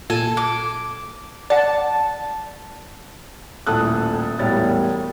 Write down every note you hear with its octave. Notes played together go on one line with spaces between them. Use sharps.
A#2 A4 G#5
D6
D5 F#5 A5
D#1 A2 A4 D#6 F#6
E1 A2 G3 C#5 A6